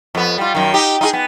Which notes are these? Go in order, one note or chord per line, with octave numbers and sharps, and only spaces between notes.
F2 B3
G3 F4
F#2 D#3
D#4 G4
D#4 F4 G#4
B3